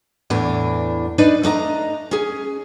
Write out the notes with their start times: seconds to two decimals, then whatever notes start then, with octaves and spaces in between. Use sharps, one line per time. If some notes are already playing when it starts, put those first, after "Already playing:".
0.30 E2 A2 E3 D4
1.18 D4 D#4 B4 D5
1.43 A3 D4 D#5 A#5
2.11 C#4 G#4